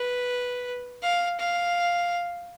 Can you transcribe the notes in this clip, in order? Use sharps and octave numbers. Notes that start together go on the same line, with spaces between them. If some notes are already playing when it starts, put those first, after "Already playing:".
Already playing: B4
F5
F5